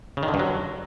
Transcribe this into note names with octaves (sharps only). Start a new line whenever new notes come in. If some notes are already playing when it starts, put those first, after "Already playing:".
C#3
D#3
D3
G2
F#3